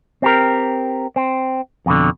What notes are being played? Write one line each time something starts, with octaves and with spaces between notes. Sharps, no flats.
C4 G4 A#4
C4
F2 B2 D3